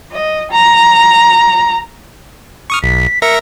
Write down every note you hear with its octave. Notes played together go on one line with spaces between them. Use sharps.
D#5
A#5
C#6 D#6 F6
B1 B6
A#4 E5 A#6 C#7